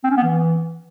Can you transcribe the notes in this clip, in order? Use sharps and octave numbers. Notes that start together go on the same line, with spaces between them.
C4
C#4
B3
E3